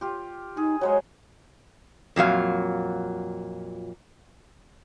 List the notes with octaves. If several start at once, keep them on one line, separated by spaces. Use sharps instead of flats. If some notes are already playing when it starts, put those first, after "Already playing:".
F4 G4
D#4 G#4
F#3 G#3 C5 C#5
F2 A#2 F#3 F5